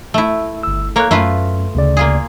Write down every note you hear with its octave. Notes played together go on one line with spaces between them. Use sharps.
A3 E4
G1 E6
A#3 A4 A#4 C#5 F#6
F#2 A3 F4 B4
D2 C#3 D5
A#3 F4 G#4